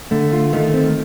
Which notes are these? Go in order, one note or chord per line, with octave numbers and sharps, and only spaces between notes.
D3 A3
F4
D#3 A3
C4